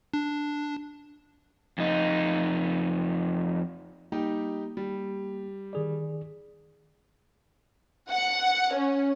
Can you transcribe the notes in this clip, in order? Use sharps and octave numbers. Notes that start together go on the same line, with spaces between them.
D4
F2 D#4
G3 A#3 D#4 G4
G3
D#3 G#4 D5
F#5
C#4